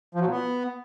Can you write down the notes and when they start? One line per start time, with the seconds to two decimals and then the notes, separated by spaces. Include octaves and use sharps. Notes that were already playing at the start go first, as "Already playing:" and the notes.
0.15 F3
0.20 F#3
0.25 A#2
0.31 B3